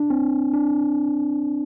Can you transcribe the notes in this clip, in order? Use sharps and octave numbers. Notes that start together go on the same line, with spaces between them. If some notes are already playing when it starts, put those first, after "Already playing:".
Already playing: D4
C4
D4